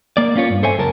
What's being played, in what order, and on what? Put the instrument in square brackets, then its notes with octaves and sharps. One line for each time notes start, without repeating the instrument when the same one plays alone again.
[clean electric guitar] A#3 D5
A#3 C#4 F4 C#5
G2
A4 C5 C#5 E5 G#5
C#2 F#2 A#4 A5